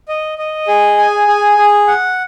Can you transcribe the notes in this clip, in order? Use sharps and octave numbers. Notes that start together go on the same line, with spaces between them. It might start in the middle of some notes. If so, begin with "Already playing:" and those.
D#5
D#5
G#4
G#5
G#4
G#4
F#5